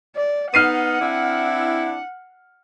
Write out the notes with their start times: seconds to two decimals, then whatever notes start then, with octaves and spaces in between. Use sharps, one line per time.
0.15 D5
0.54 B3 D#4 F#5 F6 C7 D#7
0.99 C4 D4 E4